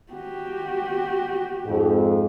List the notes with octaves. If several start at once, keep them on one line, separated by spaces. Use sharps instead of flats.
F#4 G4
F2 G#2